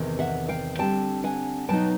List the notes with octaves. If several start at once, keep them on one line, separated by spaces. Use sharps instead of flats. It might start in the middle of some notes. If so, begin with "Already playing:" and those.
Already playing: E2 C3 D#3
E5 F#5
F5 G5
D3 G3 C4 G5 A5
F#5 G#5
B2 F#3 B3 D#4 G5 A5